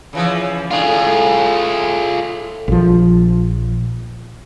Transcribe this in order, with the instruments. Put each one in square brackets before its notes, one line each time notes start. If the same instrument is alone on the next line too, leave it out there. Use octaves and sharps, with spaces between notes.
[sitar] C#3 E3 F3
[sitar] A2 D4 [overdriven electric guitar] F4 G#4
[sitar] A2
[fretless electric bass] A#1 F3